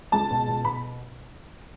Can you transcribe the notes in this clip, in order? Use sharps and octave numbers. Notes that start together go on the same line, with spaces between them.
C#2 A5
B2
B2
B2 B5